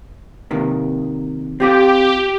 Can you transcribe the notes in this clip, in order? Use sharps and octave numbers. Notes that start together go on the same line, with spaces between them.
C3 D#3 A#3
C4 F4 G4 C5